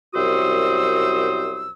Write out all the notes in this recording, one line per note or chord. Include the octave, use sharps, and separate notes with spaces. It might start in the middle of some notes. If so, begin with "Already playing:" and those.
C2 F#2 F#4 C5 D#6 E6